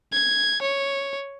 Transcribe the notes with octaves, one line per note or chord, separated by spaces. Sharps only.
G#6
C#5